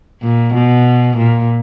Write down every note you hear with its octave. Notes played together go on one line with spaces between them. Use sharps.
A#2
B2
A#2